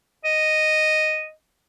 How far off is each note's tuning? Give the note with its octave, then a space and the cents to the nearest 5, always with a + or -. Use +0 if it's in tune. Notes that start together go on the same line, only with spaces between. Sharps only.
D#5 -5